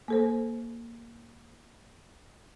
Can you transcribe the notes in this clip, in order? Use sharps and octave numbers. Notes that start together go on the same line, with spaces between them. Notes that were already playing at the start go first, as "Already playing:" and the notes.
A#3 A4 C5